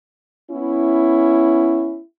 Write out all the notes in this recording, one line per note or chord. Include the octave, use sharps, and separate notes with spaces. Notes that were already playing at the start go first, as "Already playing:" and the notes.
B3 C#4 E4